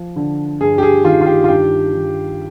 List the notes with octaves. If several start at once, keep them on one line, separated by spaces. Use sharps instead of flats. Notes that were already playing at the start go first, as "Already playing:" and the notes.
Already playing: F3
D3
G2 G#4
G4
G#4
D#3 F4
F4
G4
F4
G2 G4
D#3